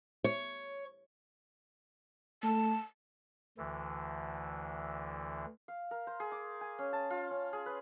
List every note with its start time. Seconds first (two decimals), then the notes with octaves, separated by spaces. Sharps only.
0.24 C#5
2.43 A3 A5
3.58 D2 D3 E3
5.68 F5
5.91 A#4
6.07 C5
6.20 G#4
6.32 D6
6.61 G#5
6.79 C#4
6.93 A5
7.10 F4
7.31 C#4
7.53 G#4
7.66 B4